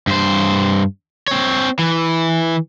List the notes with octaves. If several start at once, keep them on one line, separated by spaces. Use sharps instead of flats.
G2 C5
C4 C#5
E3